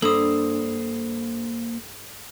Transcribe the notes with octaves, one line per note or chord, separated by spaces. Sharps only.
G2 A#3 A4 C5 D#6